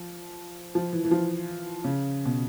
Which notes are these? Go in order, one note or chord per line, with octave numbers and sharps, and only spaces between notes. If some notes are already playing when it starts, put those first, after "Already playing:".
Already playing: F3
F3
E3
E3
F3
C#3
B2